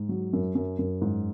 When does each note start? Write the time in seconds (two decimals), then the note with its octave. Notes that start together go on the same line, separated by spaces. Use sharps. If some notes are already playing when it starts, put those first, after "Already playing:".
Already playing: G#2
0.09 F#3
0.33 F#2
0.55 F#2
0.79 F#2
1.01 G#2